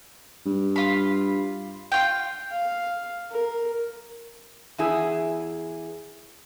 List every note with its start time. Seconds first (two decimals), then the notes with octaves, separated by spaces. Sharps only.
0.46 G2
0.76 F4 B5
1.92 F4 G5
2.51 F5
3.31 A#4
4.78 E2 E4 G#4